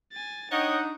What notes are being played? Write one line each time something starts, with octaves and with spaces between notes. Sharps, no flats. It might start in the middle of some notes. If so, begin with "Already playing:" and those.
G#5 A6
D4 D#4 C#5 D#5 F#5 G5